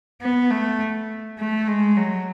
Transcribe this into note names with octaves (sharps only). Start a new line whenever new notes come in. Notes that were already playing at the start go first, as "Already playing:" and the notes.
B3
A3
A3
G#3
F#3